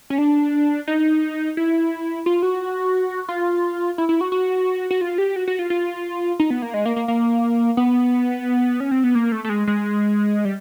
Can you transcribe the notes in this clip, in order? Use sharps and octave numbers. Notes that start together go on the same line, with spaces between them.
C#4
D4
D#4
E4
F4
F#4
F4
E4
E4
F#4
F#4
F#4
F4
G4
F#4
F#4
F4
F4
D#4
B3
A#3
G#3
A#3
A#3
A#3
B3
C#4
C4
B3
A#3
A3
A3
G#3
G#3
G3